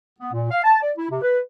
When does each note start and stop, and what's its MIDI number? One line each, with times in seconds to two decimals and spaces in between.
0.19 0.32 59
0.33 0.47 46
0.51 0.62 77
0.64 0.81 81
0.82 0.92 74
0.97 1.08 64
1.10 1.20 48
1.22 1.39 71